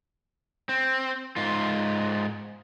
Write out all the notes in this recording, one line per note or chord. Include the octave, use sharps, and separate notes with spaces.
C4
G#2 F4